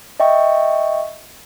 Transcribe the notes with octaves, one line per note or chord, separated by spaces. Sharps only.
D#5 E5 G5 C#6